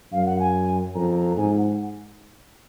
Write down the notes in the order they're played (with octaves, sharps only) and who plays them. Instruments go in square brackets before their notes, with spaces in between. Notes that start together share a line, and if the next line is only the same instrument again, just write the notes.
[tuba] F#2 [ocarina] F5
[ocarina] F#5
G#5
[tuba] F2 [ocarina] A#5
[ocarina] A#5
[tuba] G#2 [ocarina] G#5
[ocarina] F#5